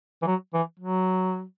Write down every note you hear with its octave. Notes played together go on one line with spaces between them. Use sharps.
E3
F#3
E3
F#3